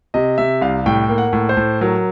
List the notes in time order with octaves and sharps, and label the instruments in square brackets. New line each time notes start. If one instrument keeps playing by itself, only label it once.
[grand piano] C3 D#5
C3 E5
C2 F5
A2 G5
A#3
F#5
A2
C5
A2
F#3 A#4